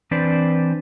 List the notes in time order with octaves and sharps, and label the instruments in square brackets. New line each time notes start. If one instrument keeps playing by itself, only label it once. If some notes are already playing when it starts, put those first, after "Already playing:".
[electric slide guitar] E3 C4 D4 B4 C5 D5